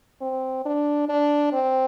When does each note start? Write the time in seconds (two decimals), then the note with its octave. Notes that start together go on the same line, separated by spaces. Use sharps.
0.21 C4
0.65 D4
1.09 D4
1.53 C4